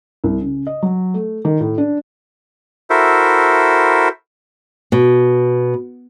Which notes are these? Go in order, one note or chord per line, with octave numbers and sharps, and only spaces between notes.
C2
C#3
D#5
F#3
A3
D#3
A2
D4
E4 F#4 A4 A#4 C5 E5
B2